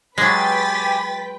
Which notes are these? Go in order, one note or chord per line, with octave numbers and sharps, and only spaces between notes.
F#3 G#3 G4 B4 G5 G#5 A6 B6